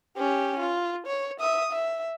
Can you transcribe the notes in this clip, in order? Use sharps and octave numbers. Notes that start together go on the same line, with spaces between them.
C#4 G4
F4
C#5
E5 D#6
E5